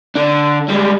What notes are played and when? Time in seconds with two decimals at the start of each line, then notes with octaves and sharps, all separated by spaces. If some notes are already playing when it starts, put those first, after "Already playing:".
0.15 D3 D4
0.68 G3 G#3